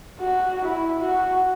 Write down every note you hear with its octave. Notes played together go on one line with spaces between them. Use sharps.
F#4
E4
F#4